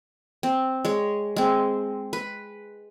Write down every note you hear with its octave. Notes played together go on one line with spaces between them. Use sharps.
C4
G#3 C#5
G#3 C4
B4